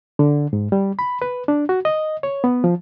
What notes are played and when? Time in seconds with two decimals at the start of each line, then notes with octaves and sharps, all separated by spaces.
0.19 D3
0.53 G#2
0.72 G3
0.99 B5
1.22 B4
1.48 D4
1.69 F#4
1.85 D#5
2.23 C#5
2.44 B3
2.64 F3